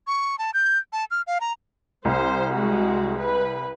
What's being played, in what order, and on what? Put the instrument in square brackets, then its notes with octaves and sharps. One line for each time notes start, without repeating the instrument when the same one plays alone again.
[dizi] C#6
A5
G6
A5
F6
F5
A#5
[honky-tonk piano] C2 [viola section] C5
[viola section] G#3 F#4
B4